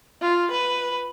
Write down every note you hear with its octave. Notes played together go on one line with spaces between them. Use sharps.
F4
B4